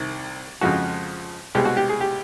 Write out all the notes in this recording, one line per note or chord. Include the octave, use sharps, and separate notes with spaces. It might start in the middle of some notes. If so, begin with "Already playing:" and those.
Already playing: C2 C3 D#3
F2 C#3 F3 G#3 F#4
C2 B2 G#3 G4
F#4
G4
G#4
G4